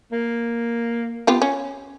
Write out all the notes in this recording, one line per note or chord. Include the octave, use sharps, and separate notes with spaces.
A#3
B3 F4 G4
C#4